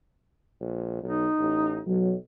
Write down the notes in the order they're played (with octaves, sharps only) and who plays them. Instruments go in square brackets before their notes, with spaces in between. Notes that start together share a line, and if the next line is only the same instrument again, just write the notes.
[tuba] A#1
[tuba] B1 [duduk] D#4
[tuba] A1
[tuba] B1 [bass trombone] F#3